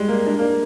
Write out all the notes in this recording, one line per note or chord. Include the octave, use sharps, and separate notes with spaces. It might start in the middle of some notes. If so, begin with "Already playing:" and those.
Already playing: G3 G#3
A#3
D4
A#3